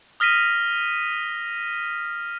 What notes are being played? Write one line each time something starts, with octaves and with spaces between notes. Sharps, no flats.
D#6 F6 A#6 B6 D#7